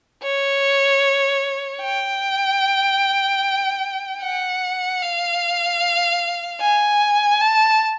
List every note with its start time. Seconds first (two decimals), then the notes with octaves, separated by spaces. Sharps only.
0.23 C#5
1.82 G5
4.21 F#5
5.02 F5
6.61 G#5
7.41 A5